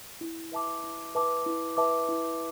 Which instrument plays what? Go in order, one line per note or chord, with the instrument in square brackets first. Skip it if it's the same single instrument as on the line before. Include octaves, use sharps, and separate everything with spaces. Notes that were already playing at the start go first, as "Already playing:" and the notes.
[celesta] E4
B4 E5 A5 D6
E4
B4 E5 A5 D6
E4
B4 E5 A5 D6
E4